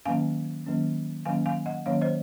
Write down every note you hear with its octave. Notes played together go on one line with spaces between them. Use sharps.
D#3 F#3 A#3 C#4 F5 G#5
D#3 F#3 A#3 C#4
D#3 F#3 A#3 C#4 F5 G#5
F5 G#5
D#5 F#5
D#3 F#3 A#3 C#4 C#5 F5
C5 D#5